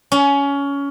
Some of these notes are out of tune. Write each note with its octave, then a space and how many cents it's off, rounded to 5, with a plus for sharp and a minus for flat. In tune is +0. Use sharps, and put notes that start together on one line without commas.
C#4 +20